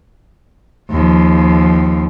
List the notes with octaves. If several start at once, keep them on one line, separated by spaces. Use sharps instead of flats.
D#2 F3